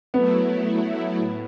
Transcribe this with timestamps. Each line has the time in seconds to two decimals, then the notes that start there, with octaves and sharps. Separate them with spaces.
0.14 F#3 A3 B3 E4
1.17 A2